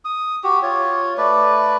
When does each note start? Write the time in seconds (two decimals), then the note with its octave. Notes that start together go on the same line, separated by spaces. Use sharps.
0.05 D#6
0.44 F#4 G4
0.63 F4 C#5
1.18 A3 B4 D5